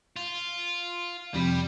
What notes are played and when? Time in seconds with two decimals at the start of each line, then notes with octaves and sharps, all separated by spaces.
0.16 F4
1.34 F2 C3 G3 B5